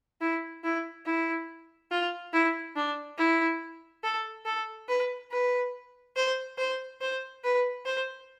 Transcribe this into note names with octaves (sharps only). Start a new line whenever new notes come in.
E4
E4
E4
F4
E4
D4
E4
A4
A4
B4
B4
C5
C5
C5
B4
C5